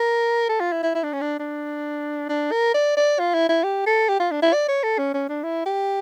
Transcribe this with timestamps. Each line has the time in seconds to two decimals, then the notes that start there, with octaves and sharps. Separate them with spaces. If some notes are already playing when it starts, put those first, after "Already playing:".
Already playing: A#4
0.49 A4
0.60 F4
0.72 E4
0.83 E4
0.95 E4
1.03 D4
1.13 C#4
1.21 D4
1.39 D4
2.29 D4
2.52 A#4
2.74 D5
2.97 D5
3.19 F4
3.34 E4
3.49 E4
3.64 G4
3.86 A4
4.09 G4
4.20 F4
4.31 D4
4.42 E4
4.53 D5
4.69 C#5
4.83 A4
4.98 C#4
5.14 C#4
5.29 D4
5.44 E4
5.66 G4